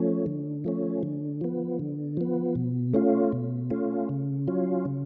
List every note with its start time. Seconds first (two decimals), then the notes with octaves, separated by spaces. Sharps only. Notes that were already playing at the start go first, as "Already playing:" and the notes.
Already playing: F3 A3 C#4
0.26 D3
0.64 F3 A3 C#4
1.03 D3
1.41 F3 B3
1.79 D3
2.17 F3 B3
2.55 B2
2.93 A3 C#4 F4
3.32 B2
3.70 A3 C#4 F4
4.09 C#3
4.48 F#3 C#4 F4
4.85 C#3